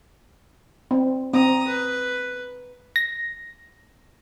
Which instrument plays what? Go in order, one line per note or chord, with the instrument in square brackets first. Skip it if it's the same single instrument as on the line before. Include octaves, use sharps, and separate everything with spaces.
[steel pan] C4
[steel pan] C4 [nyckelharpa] A#5 D#6
[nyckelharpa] B4
[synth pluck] A#6